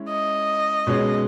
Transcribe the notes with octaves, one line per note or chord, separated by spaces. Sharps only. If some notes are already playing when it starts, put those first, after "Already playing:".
Already playing: G#3 C#4 E4
D#5
B2 G#3 C#4 G#4 C#5